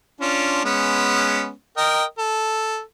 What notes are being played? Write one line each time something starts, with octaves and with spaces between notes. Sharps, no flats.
C#4 D4 F4
G#3 B3 C#4
A#4 D#5 G5
A4